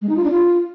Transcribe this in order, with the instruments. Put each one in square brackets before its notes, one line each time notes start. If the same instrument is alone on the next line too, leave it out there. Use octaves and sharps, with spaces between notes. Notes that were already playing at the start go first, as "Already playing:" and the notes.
[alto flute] G#3
D#4
F4
D4
F4